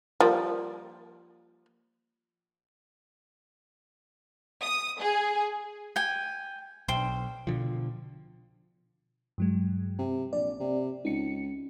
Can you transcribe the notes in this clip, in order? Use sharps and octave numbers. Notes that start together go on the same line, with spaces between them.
F3 G3 A#3
D#6
G#4
G5 G#5
B1 C5 G5
B2 D3 F3
G2 F#3 G#3
C3
A#1 D5
C3
C#2 D#4 C#7